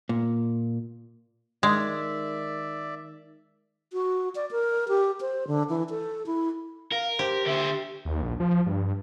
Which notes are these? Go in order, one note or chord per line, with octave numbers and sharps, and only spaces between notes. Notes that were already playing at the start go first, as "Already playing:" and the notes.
A#2
D#3 G#3 D5 E5
F#4
D5
A#4
G4
C5
D3
E3
A4
E4
A#4 F5
G4 C5
D3 C5 E5
D#2
A#1
F3
G2